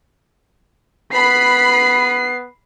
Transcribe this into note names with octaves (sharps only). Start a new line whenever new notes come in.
B3 B4 B5 C7